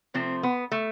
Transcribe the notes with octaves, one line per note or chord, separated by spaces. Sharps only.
C3 F3 A3 C4
B3
A3